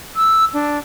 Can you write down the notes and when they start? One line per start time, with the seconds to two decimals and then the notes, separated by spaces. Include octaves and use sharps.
0.16 E6
0.54 D4